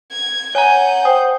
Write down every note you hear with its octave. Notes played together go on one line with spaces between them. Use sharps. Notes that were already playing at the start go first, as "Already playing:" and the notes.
G#6
C#5 F#5 G#5 A#5 G6
C5 G5 D#6